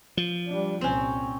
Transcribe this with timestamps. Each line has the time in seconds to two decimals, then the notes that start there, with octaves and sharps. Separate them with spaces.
0.17 F3
0.48 G3 D4
0.81 C2 A#2 C4 C#4